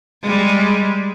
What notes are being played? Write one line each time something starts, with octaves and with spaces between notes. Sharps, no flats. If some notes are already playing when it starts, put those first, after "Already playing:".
G3 G#3